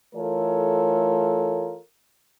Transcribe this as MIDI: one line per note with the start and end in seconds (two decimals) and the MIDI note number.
0.15 1.77 52
0.15 1.77 57
0.15 1.77 65
0.15 1.77 69
0.15 1.77 70
0.15 1.77 73